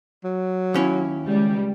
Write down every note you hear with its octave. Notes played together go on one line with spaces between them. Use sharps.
F#3
D#2 C#4 E4
C#2 G3